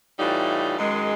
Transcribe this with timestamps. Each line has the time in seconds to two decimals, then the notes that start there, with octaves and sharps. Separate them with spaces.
0.18 A2 E3 G3 D#4 F4
0.76 F#2 D#3 G#3